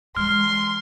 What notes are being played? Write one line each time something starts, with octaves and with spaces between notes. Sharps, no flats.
E3 G#3 C6 F6